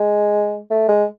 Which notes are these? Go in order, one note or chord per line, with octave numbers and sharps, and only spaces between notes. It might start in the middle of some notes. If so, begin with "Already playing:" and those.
Already playing: G#3
A3
G#3